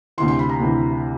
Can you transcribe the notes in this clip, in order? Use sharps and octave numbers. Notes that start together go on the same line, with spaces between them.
D2 C3 E3 C6
C6
B5
A#5
D2 C3 E3